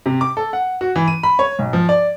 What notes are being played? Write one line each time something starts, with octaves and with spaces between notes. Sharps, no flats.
C3
D6
A4
F#5
F#4
E3
D#7
B5
C#5
B1
F3
D5